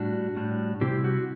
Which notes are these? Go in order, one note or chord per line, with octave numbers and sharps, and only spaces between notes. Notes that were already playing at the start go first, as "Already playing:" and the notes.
Already playing: A2 G3 D4 F#4
A2 G3 D4
C3 G3 C4 E4 G4
F#4